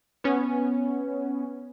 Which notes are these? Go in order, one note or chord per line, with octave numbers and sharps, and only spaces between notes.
B3 C#4